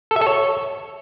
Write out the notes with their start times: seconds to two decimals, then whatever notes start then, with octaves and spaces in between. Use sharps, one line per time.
0.11 A4
0.16 E5
0.21 A4
0.27 C#5